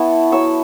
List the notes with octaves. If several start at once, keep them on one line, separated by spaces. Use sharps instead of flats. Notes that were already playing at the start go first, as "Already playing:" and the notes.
Already playing: B3 E4 A5 C#6
F#3 C#6 E6